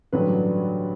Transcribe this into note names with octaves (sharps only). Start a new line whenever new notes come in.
A1 G2 D3 F#3 B4